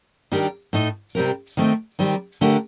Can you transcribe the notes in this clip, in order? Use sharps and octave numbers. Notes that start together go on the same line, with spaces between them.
D#3 G3 D4 G4 A#4
A2 A3 D#4
C3 G3 C4 G4 A#4
D#3 A3 C4 D#4
D#3 G3 C4 G4 A#4
D3 A3 D4 G4 A#4